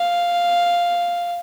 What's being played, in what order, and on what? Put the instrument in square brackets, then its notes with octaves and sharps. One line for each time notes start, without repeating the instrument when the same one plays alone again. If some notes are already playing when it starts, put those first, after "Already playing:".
Already playing: [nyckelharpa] F5